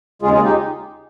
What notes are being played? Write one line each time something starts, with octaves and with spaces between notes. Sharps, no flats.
D#2 C#3 G#3 F4 G#4
F4 G#4
D#4 G4